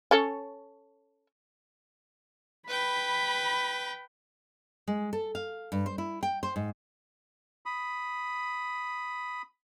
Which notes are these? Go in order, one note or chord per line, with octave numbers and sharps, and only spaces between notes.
C#4 A4 C#5
B4 G5 B5
G#3
A4
F5
G2
C5
E4
G5
C5
G#2
B5 D#6